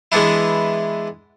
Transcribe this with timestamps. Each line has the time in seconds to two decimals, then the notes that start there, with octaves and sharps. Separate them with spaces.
0.12 E3 G#3 B3 D4 E4